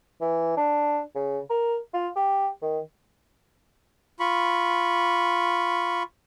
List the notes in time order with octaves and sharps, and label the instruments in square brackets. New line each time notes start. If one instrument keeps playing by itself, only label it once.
[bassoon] E3
D4
C#3
A#4
F4
G4
D#3
[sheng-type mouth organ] F4 B5 C#6